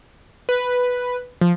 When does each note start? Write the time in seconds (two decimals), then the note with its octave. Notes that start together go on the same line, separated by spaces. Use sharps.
0.49 B4
1.41 F3